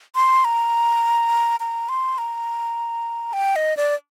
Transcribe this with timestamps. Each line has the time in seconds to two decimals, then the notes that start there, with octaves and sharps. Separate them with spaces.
0.15 C6
0.45 A#5
1.60 A#5
1.89 C6
2.18 A#5
3.33 G5
3.56 D#5
3.77 D5